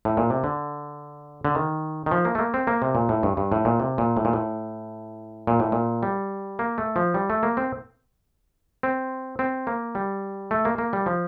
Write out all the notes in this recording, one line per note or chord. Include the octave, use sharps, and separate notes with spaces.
A2
A#2
C3
D3
D3
D#3
D#3
F3
A#3
A3
A#3
C4
A#3
C3
A#2
A2
G2
G2
A2
A#2
C3
A#2
A2
A#2
A2
A#2
A2
A#2
G3
A#3
A3
F3
G3
A3
A#3
C4
C4
C4
A#3
G3
A3
A#3
A#3
G3
F3